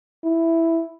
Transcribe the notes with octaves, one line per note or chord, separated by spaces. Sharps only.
E4